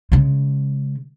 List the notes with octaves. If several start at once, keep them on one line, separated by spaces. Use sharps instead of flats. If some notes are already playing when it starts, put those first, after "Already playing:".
C#3 G#3